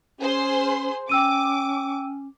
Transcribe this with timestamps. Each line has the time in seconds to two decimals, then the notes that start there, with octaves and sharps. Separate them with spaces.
0.20 C#4 G#4 C5 C6
1.09 C#4 G5 D6 E6 D#7